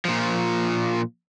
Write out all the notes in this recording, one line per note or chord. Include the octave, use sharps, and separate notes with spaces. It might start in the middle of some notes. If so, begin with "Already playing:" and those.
A#2 F3